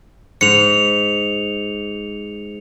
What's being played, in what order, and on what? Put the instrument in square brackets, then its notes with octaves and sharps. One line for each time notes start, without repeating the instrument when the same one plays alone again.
[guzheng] G#2 [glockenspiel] C#7 F7